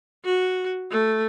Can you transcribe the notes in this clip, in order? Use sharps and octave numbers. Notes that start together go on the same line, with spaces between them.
F#4
A3